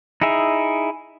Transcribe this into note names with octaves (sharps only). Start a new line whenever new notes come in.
D#4 E4 G#4 E5